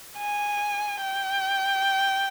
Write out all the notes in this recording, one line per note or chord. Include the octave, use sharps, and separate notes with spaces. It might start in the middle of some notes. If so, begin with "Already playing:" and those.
G#5
G5